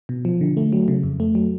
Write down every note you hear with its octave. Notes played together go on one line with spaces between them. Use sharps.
B2
F3
D3
A3
F#3
C#3
F2
A3
F#3